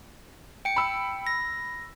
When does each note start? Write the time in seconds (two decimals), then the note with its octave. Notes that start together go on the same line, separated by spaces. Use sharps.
0.65 G5 C#7
0.76 B5 E6
1.27 A#6